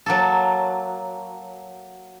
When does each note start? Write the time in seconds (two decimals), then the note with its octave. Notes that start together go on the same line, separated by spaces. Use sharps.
0.06 F#3 A#3 A4